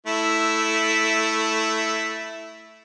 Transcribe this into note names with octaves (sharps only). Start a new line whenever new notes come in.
A3 E4